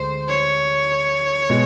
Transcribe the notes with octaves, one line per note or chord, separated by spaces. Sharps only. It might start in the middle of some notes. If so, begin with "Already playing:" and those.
Already playing: D2 G#3 C5
C#5
B2 G#3